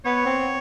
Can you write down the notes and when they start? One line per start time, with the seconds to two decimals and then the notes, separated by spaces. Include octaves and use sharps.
0.06 B3 C#5
0.26 C4